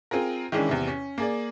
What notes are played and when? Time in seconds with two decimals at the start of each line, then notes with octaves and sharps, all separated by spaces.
0.11 C4 F4 G#4 A#4
0.52 D#3 E3 G#3 C#4 D4 E4
0.69 E2 C3
0.87 C#4
1.18 A#3 G#4 D5